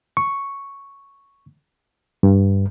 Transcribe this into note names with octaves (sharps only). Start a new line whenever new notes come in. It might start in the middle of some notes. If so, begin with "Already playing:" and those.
C#6
G2